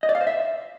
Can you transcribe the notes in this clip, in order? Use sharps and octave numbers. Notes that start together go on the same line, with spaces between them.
D#5
D5
F5
C5
E5